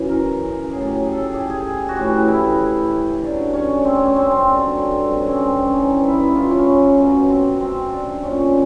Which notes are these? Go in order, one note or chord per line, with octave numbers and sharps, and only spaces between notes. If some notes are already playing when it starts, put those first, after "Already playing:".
Already playing: F#2 C#3 E3
A#4
A2 F#3 G#4
G4
G#4
A4
G#4
G4
G#4
F#4
A2 E3 G4
E4
G2 D3 F#3 D4
C#4
C4
C#4
C#4
C4
C4
G2 D3 F#3
C4
C#4
C4
C4
C#4
G2 E3 D#4
E4
E4
F4
C#4
B2 F#3
C4
C4
D4
A#2 F3 C#4